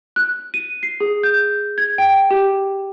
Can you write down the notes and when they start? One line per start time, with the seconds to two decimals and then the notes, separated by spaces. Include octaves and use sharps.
0.16 F#6
0.54 D#7
0.83 C7
1.00 G#4
1.23 G6
1.78 G#6
1.98 G5
2.31 G4